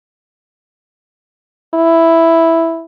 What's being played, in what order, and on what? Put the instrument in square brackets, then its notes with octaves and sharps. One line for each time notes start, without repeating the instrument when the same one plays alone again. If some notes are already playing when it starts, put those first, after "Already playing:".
[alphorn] E4